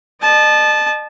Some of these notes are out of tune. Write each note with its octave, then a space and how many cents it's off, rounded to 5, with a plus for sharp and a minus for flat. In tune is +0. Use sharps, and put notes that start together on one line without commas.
D#5 -40 A5 -15